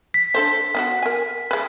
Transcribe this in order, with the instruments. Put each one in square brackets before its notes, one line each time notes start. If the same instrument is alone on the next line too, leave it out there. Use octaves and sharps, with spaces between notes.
[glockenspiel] B6
[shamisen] D4 A4 C5
B3 D#4 F#4
A#4 G#5
G#3 B4